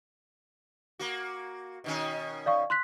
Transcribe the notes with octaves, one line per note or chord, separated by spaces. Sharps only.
A#3 F#4
B2 D#3 C#4
D5 F5 C#6
C6 F#6 B6